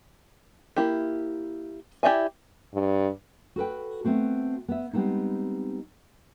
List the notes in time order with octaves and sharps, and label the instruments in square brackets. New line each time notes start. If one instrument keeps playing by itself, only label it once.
[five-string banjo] A#3 E4 G4
E4 G4 D5 E5 G#5
[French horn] G2
[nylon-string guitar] F#4 A4 B4 G5
A3 B3 C4 F#4
B3 E5
G3 G#3 B3 C4 D#4